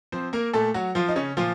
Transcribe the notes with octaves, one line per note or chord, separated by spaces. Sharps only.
F3 C4 C5
A#3 A#4
A#2 A3 A4
F#3 F#4
F3 F4
D#4
C#3 C#4
A#2 F3 F4